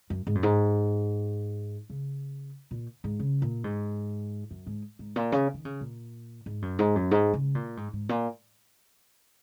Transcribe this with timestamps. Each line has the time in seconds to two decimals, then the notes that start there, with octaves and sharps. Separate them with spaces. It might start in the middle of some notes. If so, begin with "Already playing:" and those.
0.10 F#2
0.27 G#2
0.35 F#2
0.43 G#2
1.90 C#3
2.71 A#2
3.04 G#2
3.19 C#3
3.42 A#2
3.64 G#2
4.51 F#2
4.67 G#2
4.99 G#2
5.16 A#2
5.32 C#3
5.54 D#3
5.65 C#3
5.81 A#2
6.46 G#2
6.62 F#2
6.79 G#2
6.95 F#2
7.11 G#2
7.33 C#3
7.55 A#2
7.77 G#2
7.93 G#2
8.09 A#2